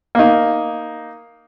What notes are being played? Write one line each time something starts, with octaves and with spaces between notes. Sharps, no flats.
A#3 D#4